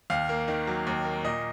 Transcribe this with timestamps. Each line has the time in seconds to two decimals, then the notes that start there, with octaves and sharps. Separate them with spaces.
0.10 D#2 F5
0.29 A#3
0.48 D#3
0.67 F#3
0.87 D#2
1.05 A#3
1.24 A#2 D#5